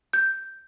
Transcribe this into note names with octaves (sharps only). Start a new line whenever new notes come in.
G6